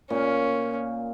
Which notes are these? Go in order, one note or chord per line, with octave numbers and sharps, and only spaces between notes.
A#2 C#4